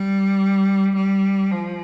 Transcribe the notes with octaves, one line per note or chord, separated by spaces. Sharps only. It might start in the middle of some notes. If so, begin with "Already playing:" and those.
Already playing: G3
G3
F3